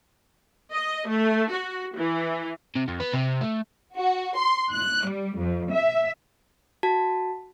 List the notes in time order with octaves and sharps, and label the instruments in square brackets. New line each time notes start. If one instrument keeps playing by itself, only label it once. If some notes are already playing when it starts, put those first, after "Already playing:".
[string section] D#5
A3
F#4
E3
[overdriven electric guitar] C3
F2
B3
C3
A3
[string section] F#4
C6
F#6
G3
F2
E5
[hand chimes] F#4 A5